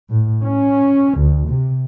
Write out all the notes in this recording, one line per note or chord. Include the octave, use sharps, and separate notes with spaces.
A2
C#4
D2
C3